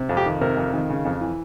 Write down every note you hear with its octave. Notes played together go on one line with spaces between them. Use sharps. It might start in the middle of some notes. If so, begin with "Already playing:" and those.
Already playing: C3
F2
G4
D#3
C3 A#4
F2
D#3
C#3
F2
E3